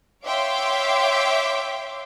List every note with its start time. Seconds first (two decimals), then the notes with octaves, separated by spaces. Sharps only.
0.25 C#5 E5 F5 G5 C6 D6